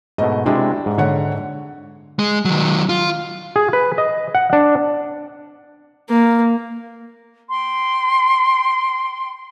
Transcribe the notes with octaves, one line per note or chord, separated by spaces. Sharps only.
G#2 B2 A3 D#5
C3 G#3 D4 E4 F#4
G#2
D3 C#5 F#5
G#3
D#3 F#3
F4
G#4
B4
D#5
F#5
D4
A#3
G5 C6